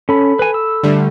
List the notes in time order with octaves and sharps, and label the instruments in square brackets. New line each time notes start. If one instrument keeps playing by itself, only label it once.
[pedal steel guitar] C#4 [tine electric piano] A4 B5
[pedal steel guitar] B4 G#5
E6
[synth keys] D3 G3 A3